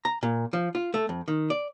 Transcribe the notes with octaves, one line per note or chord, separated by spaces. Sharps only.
A#5
A#2
F3
F4
A3
F2
D#3
D5